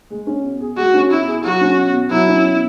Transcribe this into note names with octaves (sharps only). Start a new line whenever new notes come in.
G#3
C#4
B2
G#4
G#3 F#4
C#4
B2 E4
G#4
F#3 F#4
C#4
B2
B2
F#3 E4
C#4
B2